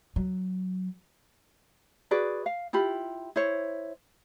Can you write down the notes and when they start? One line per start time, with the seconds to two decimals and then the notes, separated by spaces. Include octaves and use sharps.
0.16 F#3
2.11 F#4 G#4 B4 D5
2.46 F5
2.73 E4 F4 G4 B5
3.36 E4 C5 C#5